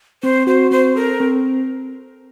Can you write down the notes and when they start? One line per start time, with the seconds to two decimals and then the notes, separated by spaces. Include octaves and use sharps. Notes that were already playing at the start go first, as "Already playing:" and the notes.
0.23 C4 C5
0.47 F#4 C5
0.71 C4 C5
0.96 A4 A#4
1.20 C4